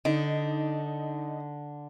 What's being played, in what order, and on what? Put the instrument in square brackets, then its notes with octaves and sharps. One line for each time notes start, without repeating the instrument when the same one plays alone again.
[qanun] D3 [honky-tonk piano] D#4